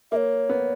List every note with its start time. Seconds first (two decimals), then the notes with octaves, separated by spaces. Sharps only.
0.12 A#3 C#5 E5
0.49 B3